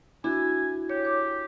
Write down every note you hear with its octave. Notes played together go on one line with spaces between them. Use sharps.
D4 E4 F#4 G#5
G4 C#5
C#5 D6